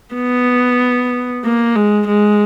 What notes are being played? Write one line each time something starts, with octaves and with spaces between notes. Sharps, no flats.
B3
A#3
G#3
G#3